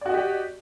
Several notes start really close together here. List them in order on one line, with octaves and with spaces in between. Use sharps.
D5 F#4 D#5 G4